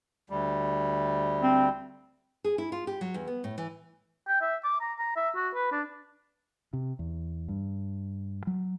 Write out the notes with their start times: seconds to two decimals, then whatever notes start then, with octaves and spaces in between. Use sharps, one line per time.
0.30 D2 G3
1.42 C4
2.44 G#4
2.58 E4
2.72 F4
2.87 G4
3.01 F#3
3.14 E2
3.27 B3
3.44 A2
3.58 E3
4.28 G5
4.42 E5
4.64 D6
4.81 A#5
4.99 A#5
5.16 E5
5.35 F#4
5.55 B4
5.72 D4
6.73 C3
6.99 E2
7.48 G2
8.47 F#3